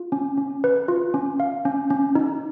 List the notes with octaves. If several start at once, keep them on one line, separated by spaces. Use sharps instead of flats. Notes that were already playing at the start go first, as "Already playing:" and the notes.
Already playing: F4
C#4
C#4
B4
F4
C#4
F5
C#4
C#4
D#4